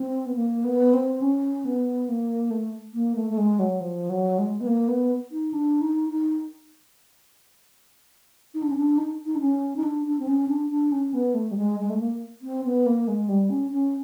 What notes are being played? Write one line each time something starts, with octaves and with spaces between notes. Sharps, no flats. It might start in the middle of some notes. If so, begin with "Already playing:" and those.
Already playing: C4
B3
A#3
B3
C4
C#4
B3
A#3
A3
A#3
A3
A3
G#3
F#3
F3
F#3
G#3
B3
A#3
B3
D#4
D4
D#4
D#4
D#4
D4
C#4
D4
D#4
D#4
D4
C#4
D#4
D4
D4
C4
C#4
D4
D4
C#4
B3
A3
G3
G#3
G#3
A3
A#3
C4
B3
A#3
G#3
G3
C#4
C#4